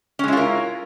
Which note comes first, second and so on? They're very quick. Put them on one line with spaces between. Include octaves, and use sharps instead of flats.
C#4 G#3 E4 F4 A#4